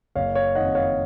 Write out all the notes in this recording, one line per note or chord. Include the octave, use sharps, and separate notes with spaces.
F#1 C#5 F5
C#5 F5
F2 D#3 D#5 F#5
C#5 F5